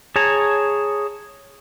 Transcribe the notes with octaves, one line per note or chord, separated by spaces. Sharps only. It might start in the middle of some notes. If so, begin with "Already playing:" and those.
G#4 C#5 A5 A#5